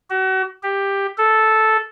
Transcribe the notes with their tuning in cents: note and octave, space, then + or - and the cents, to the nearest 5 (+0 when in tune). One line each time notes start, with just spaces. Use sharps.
F#4 +35
G4 +10
A4 -5